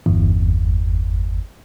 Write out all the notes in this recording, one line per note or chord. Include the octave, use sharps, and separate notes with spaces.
G1 E2